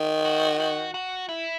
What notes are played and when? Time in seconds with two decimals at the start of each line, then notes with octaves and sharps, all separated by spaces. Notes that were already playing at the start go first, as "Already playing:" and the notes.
Already playing: D#3
0.25 F#4
0.60 F#4
0.94 F#4
1.29 E4